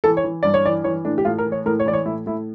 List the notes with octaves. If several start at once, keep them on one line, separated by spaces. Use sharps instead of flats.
E3 A4
C#5
E3
G2 D5
C#5
E3 D5
E3 C#5
A2 D4
G4
A2 F4
A#4
E3
C#5
A2 A#4
C#5
E3 D5
C#5
A2 E4
A2 E4